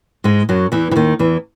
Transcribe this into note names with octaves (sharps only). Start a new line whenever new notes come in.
G#2 G#3
F#2 F#3
E2 E3
E3
D#2 D#3
E2 E3